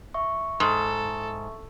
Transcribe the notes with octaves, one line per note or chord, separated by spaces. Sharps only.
E5 C#6
G#2 A4